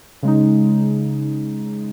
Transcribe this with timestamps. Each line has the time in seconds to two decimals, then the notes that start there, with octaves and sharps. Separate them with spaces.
0.23 C#3 G#3 D#4